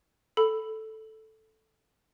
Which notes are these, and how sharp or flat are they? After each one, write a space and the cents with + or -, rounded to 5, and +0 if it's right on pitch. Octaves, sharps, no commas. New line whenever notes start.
A4 +0 B5 +5